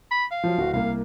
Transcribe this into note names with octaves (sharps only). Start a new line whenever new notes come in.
B5
F5
F3 F#3
D1 F#4
C2 A#3 F5